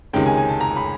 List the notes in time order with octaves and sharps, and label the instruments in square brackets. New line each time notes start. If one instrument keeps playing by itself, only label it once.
[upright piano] C#2 C3 D#3 G#3 C#4 G5
G#5
G#5
A5
A#5
B5